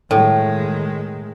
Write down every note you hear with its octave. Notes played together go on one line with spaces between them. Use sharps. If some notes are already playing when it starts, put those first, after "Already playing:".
A2 D#3 G#3